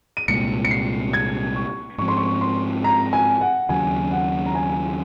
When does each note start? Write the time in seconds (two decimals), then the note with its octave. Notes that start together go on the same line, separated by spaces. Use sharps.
0.17 D#7
0.28 C2 A#2 G#3 C#7
0.65 C#7
0.71 C7
1.13 G#6
1.56 C#6
1.98 G#2 F3 C4 C#6
2.08 C6
2.17 C#6
2.41 C6
2.84 A#5
3.13 G#5
3.41 F#5
3.69 D#2 C#3 F#3 G#5
4.12 F#5
4.46 A#5
4.55 G#5